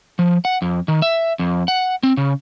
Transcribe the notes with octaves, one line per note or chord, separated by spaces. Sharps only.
F3
F#5
F2
D#3
E5
F2
F#5
C4
C#3